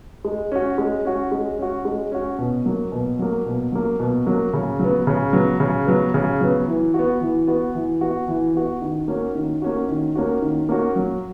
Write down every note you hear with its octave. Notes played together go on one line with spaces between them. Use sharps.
G#3
C#4 F#4
G#3
C#4 F#4
G#3
C#4 F#4
G#3
C#4 F#4
B2
F#3 A#3
B2
F#3 A#3
B2
F#3 A#3
B2
F#3 A#3
C#3
F#3 B3
C#3
F#3 B3
C#3
F#3 B3
C#3
F#3 B3
E3
F#4
B3
E3
B3 F#4
E3
B3 F#4
E3
B3 F#4
D#3
A#3 C#4 F#4
D#3
A#3 C#4 F#4
D#3
A#3 C#4 F#4
D#3
A#3 C#4 F#4
F#3